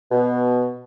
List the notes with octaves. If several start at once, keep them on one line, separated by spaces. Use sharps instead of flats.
B2